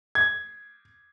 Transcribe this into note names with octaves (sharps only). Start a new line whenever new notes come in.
G#6